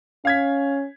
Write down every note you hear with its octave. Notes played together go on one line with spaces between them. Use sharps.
C#4 F5 G#6 B6